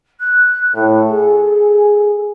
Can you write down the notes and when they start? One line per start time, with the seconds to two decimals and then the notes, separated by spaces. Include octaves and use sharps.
0.20 F#6
0.74 A2 A4
1.10 G#4